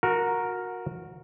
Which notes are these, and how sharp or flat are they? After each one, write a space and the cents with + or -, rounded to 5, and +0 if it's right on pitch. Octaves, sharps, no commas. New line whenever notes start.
F#4 -20 A#4 +0